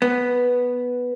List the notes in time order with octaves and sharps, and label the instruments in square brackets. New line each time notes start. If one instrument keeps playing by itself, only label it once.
[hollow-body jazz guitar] B3